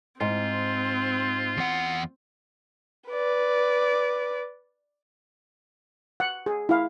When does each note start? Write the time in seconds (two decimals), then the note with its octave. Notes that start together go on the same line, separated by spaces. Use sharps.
0.21 G#2 C4 F4
1.57 E2 F#5
3.10 B4 D5
6.20 F#5
6.46 G#4
6.69 E4 F5